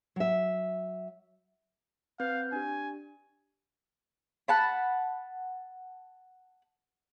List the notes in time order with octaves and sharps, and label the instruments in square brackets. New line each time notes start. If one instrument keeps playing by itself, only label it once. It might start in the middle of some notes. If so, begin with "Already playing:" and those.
[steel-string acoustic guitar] F#3 E5
[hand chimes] C4 B4 G6 [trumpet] F5
[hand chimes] D4 G4 [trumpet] G#5
[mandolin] F#5 A5 B5